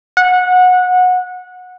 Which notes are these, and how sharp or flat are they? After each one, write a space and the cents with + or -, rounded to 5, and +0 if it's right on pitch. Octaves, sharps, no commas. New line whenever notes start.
F#5 -20